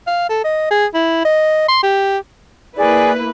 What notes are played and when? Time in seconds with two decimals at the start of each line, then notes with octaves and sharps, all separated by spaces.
0.07 F5
0.29 A4
0.44 D#5
0.70 G#4
0.94 E4
1.25 D#5
1.68 C6
1.83 G4
2.77 A#3 E4 G#4 B4 D5